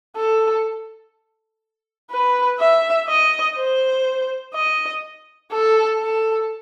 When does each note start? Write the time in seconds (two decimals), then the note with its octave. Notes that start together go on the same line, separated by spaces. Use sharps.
0.16 A4
2.10 B4
2.59 E5
3.08 D#5
3.56 C5
4.54 D#5
5.51 A4
6.00 A4